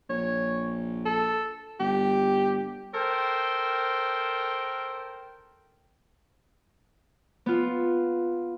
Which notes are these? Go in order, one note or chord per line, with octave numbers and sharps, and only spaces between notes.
A#1 C#5
A4
G1 G4
A4 A#4 C5 G5
B3 F4